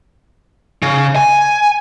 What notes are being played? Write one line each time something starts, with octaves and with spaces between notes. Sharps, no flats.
C#3
G#5